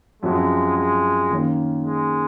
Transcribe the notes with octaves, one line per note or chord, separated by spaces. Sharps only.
F#2 F3 G#3 C4 F#4
G#3
D#3 A#3 C#4
G#3